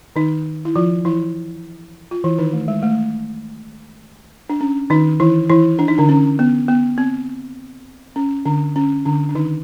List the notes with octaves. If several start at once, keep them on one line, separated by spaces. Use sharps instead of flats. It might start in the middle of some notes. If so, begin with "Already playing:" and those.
D#3 D#4
E4
F3 F4
E3 E4
F4
E3 E4
D#3 D#4
A3
G#3
A3
D4
C#4
D#3 D#4
E3 E4
E3 E4
D4
D#4
D3 D4
C#4
B3
B3
C4
C#4
D3 D4
C#4
D3 D4
D4
D#3 D#4